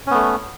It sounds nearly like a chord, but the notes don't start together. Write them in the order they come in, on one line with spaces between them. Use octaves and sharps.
C#4 B3 A3